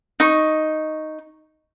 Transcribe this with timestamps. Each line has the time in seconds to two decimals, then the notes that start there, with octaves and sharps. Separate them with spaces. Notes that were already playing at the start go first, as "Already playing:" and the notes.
0.20 D#4 C#6